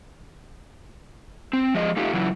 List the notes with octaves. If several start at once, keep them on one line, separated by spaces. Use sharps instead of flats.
C4
F3 G#3 D#5
A3 D#4 F4 G4
C#3 E3 F#3